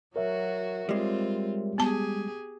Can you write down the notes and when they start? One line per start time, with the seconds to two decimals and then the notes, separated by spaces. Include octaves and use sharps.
0.16 F#3 F#4 A#4 C#5 E5
0.89 G3 G#3 C4 F4
1.78 B3 G4 G#4 A5